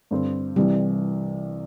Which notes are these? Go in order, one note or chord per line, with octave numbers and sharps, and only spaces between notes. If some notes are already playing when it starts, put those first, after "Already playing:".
G2 D3 C4
C2 C3 E3 G3